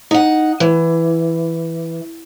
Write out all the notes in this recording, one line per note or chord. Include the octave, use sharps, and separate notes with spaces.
D#4 F#5
E3